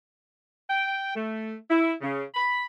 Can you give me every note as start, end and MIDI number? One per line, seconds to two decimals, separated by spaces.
0.70 1.14 79
1.16 1.55 57
1.69 1.91 64
2.02 2.23 49
2.35 2.64 83